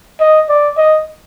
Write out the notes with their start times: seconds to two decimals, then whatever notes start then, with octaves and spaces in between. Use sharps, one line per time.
0.20 D#5
0.49 D5
0.77 D#5